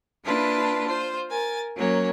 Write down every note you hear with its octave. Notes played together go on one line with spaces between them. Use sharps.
A#3 D4 E4 F4 B4 A5
F4 C5
A#4 G#5 A6
F#3 A#3 C#4 C#5